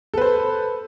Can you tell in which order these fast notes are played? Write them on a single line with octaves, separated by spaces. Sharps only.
A4 B4 C5